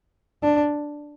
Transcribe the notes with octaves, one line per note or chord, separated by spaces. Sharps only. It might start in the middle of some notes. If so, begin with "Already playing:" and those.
D4